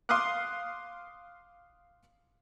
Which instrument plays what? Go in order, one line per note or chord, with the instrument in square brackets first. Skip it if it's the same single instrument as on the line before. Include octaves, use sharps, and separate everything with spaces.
[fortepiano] F5 C6 D6 D#6 F6 F#6